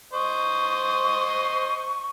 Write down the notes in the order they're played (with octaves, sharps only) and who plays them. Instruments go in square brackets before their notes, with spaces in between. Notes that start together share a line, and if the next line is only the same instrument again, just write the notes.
[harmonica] C5 D#5 [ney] C#6